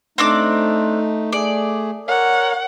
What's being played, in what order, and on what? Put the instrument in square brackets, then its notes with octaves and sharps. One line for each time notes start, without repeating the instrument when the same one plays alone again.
[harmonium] A3 D#4 [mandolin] C4 D4 D6
[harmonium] A3 G#4 [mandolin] D5
[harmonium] A#4 C#5 [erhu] F#5